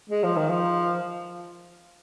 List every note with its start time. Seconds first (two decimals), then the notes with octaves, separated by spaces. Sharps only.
0.10 G#3
0.24 F3
0.37 D#3
0.49 F3